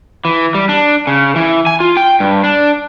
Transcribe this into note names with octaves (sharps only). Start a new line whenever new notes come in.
E3
G3
D4
C#3
E3
G#5
F4
G5
G2
D4